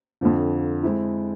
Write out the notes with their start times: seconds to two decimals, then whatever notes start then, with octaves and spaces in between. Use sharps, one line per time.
0.21 F2 D3 F3
0.83 G#3 C4 E4